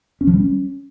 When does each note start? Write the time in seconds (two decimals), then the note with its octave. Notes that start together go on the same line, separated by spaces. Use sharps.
0.21 C#4
0.27 F3
0.34 G3
0.40 C#4